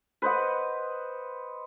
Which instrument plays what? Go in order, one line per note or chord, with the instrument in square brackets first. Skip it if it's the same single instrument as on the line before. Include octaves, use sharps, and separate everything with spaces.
[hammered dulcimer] B4 C5 D#5 F#5